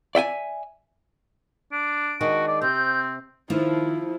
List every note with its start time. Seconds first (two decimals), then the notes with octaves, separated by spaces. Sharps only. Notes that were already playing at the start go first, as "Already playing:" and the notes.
0.15 D5 E5 G5 G#5
1.72 D4 D7
2.21 D#3 G#3 D4 F#4
2.47 D5
2.62 C3 C4 G6
3.50 D#3 F3 E4